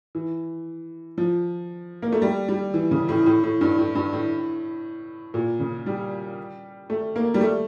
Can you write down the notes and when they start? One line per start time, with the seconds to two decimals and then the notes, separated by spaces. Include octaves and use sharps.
0.15 E3
1.18 F3
2.02 A#3
2.12 A3
2.22 G3
2.48 G3
2.74 E3
2.91 C#3
3.09 A2
3.26 A2
3.43 A2
3.61 G2
3.78 A2
3.95 G2
4.13 A2
5.34 A#2
5.60 C#3
5.86 G3
6.90 A3
7.16 A#3
7.34 G3
7.41 A3